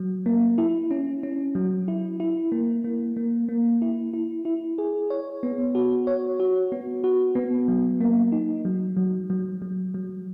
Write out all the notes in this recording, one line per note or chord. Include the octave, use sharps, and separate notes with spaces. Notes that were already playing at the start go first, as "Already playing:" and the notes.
Already playing: F#3
A#3
E4
C#4
C#4
F#3
E4
E4
A#3
A#3
A#3
A#3
E4
E4
E4
G#4
C#5
B3
F#4
C#5
F#4
B3
F#4
B3
F#3
A#3
D#4
F#3
F#3
F#3
F#3
F#3